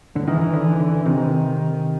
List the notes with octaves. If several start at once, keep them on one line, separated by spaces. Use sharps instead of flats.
D3
D#3 E3
D3
D3
C3 D#3